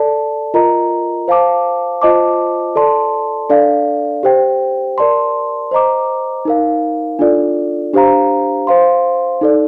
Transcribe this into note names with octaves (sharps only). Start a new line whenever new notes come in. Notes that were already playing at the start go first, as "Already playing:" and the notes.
Already playing: A4 D5 A5
F4 A#4 D#5 A#5
C5 F5 A5 D6
F4 C5 D#5 A5 D6
A4 D5 A5 C6
D4 A4 D5 F5
G4 C5 G5
A#4 D5 A5 C6
C5 D#5 A#5 D6
D#4 A#4 F5
D4 F4 A4 D5
D4 G4 C5 F5 A#5
C5 F5 C6
D#4 A4 D5